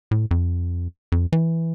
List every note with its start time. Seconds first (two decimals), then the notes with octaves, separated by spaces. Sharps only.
0.11 A2
0.31 F2
1.12 F2
1.33 E3